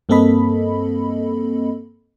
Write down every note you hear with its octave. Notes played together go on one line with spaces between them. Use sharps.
G2 A#3 C4 A4 D#5 B5